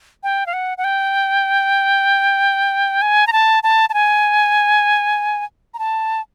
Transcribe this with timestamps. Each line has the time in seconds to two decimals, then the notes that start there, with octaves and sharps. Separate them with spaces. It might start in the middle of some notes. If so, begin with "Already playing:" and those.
0.23 G5
0.46 F5
0.53 F#5
0.78 F#5
0.84 G5
3.02 G#5
3.27 A#5
3.33 A5
3.63 A5
3.89 A5
3.94 G#5
5.74 A#5
5.79 A5